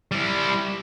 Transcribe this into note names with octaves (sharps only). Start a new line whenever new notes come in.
G3 E4